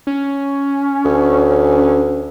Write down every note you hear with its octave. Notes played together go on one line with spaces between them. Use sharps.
C#4
D2